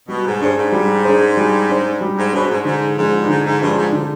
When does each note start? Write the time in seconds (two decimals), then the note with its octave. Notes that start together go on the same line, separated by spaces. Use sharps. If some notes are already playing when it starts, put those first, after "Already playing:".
0.08 B2 G3
0.25 G#2
0.41 G2 D4 G#4 C5
0.57 G#2
0.72 G3
1.05 D4 G#4 C5
1.37 G3
1.69 D4 G#4 C5
2.01 G3
2.17 G#2
2.33 B2 D4 G#4 C5
2.49 G#2
2.64 G#2 D3
2.97 G#2 F3 G#3 D4
3.18 G2
3.29 G#2 D3
3.45 G#2
3.61 G2 F3 G#3 D4
3.77 G#2
3.92 D3